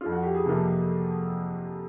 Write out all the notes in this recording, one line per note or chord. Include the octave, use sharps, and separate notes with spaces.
F2 F4
F#4
G4
G#4
C3 F3 A#3 A4